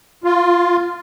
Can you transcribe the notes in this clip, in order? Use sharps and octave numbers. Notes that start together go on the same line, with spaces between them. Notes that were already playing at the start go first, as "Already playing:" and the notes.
F4